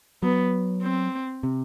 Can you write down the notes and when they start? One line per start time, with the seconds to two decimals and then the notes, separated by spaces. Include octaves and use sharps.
0.23 F#3 B3
0.83 C4
1.43 C3